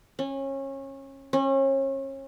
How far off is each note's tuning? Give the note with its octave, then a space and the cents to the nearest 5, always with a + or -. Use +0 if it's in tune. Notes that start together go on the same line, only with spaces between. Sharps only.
C#4 -25
C#4 -35